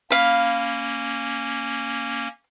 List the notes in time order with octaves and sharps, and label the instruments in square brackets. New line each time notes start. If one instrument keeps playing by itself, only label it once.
[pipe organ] A#3 C#4 [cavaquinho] F5 B5